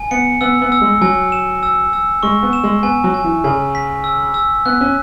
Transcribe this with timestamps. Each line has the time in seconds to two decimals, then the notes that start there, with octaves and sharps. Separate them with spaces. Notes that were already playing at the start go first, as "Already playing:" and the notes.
Already playing: G#5
0.11 B3 C#7
0.41 B3 E6
0.62 B3
0.72 E6
0.81 G#3
1.01 F#3 G#5
1.32 E7
1.63 E6
1.93 E6
2.23 G#3 C#6
2.43 B3
2.53 E7
2.63 G#3
2.83 B3 G#5
3.04 F#3
3.14 G#5
3.24 E3
3.44 C#3 G#5
3.75 B6
4.04 E6
4.34 E6
4.66 B3 F#6
4.81 C#4